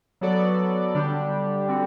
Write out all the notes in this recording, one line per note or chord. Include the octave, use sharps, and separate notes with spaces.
F#3 B3 F#4 A4 D5
D3 G3 D4 G4
D3 G3 C4 F#4